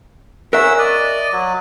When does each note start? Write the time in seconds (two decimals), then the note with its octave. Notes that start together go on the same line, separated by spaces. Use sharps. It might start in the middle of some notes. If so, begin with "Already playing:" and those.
0.53 C#4 A#4 E5 F#5 E6
0.78 D5 D#5
1.32 F#3